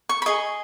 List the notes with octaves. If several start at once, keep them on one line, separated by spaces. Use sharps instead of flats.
C#6
B5
G#4 D#5 C#6